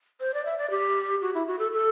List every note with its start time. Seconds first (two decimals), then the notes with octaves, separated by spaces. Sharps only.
0.20 C5
0.34 D5
0.45 E5
0.58 D5
0.70 G4
1.22 F#4
1.34 E4
1.47 F#4
1.59 A4
1.72 A4